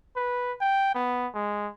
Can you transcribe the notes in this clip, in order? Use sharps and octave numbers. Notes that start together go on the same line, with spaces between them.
B4
G5
B3
G#3